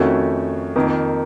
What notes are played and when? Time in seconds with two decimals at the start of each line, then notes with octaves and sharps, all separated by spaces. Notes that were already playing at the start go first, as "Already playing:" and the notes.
Already playing: F2 D#3 A3 C#4 F#4
0.76 F2 D#3 A#3